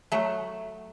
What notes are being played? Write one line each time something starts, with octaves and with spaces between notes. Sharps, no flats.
F#3 A3